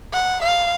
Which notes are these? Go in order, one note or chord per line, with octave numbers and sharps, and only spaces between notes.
F#5
F5